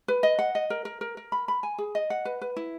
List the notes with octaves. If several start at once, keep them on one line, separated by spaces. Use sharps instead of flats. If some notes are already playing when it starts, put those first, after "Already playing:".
B4
D#5
F#5
D#5
A#4
A#4
A#4
A#4
B5
B5
G#5
G#4
D#5
F#5
B4
B4
E4